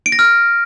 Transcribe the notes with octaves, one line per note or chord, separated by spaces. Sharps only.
D7
A#6
F6